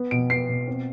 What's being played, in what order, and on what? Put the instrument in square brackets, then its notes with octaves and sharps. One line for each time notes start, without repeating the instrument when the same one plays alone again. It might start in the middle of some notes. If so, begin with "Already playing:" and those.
Already playing: [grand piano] B3
B2 D7
B3 C7
B2
C4